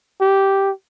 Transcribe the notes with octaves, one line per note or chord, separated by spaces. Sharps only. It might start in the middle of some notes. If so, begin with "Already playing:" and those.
G4